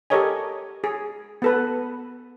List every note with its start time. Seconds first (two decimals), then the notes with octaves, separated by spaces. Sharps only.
0.10 G4 A4 A#4 C#5 D#5 G#5
0.84 G#4
1.42 B3 A4 B4